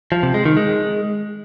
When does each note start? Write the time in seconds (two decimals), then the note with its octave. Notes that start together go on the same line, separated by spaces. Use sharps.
0.12 F3
0.23 C3
0.34 G#3
0.45 D#3
0.57 G#3